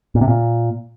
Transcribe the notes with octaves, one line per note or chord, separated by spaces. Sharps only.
A#2
C3
A#2